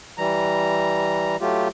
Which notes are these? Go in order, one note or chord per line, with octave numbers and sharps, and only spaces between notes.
E3 G3 A#5
F#3 A3 F4 G4